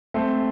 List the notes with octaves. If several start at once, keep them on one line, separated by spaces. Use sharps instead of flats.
A3 C4